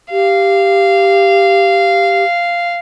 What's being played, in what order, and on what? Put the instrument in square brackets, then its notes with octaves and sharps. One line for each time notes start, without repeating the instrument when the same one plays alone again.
[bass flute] G4 [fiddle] F5